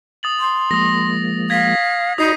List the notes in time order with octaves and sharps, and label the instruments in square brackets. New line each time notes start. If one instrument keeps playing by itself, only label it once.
[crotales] D#6 A6 F#7
[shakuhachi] C6
[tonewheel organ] F3 G#3 A#3 [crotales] D#6 A#6
[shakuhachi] F5 [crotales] G#6 A#6 B6
[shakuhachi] D#4 [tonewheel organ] F#4 D5 B5 [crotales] D#6 C7 D#7